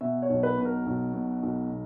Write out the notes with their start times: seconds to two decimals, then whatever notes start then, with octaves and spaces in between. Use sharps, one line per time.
0.01 B2 E5
0.22 C#5
0.30 B1
0.43 B4
0.58 B2
0.65 A#4
0.86 B1
1.13 B2
1.43 B1
1.71 B2